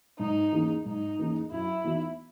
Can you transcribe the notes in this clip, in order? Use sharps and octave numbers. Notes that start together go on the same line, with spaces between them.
G#2 D#4
E3 A#3 C#4 G#4
G#2 D#4
E3 A#3 C#4 G#4
F#2 E4
E3 B3 D#4 F#4